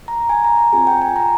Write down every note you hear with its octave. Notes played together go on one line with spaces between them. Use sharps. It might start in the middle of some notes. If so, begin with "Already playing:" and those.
A#5
G#5
A#5
A#5
C4 F4 G#4 G#5
G5
G#5
A#5